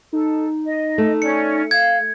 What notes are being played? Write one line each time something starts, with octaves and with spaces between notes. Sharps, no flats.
D#4 A4
D#5
A3
C#4 D5 C#7
F5 G#6